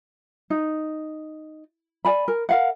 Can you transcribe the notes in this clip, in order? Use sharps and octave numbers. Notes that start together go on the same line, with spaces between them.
D#4
D5 G#5 B5
A#4
A#4 F5 F#5